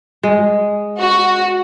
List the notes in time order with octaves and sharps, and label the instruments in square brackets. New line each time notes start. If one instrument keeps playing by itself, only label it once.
[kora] G#3
[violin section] F#4